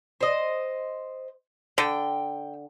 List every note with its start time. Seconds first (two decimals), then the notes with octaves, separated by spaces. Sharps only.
0.21 C5 D#5
1.78 D3 G5